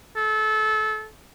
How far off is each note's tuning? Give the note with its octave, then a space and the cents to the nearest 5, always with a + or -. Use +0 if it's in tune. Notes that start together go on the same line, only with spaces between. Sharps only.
A4 -25